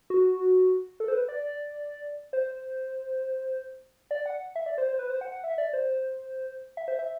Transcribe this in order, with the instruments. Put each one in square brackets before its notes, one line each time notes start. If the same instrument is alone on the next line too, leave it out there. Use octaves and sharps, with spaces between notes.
[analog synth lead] F#4
A4
C5
B4
D5
C5
D5
F#5
E5
D5
C5
C5
B4
C5
F#5
F#5
E5
D5
C5
E5
C5
E5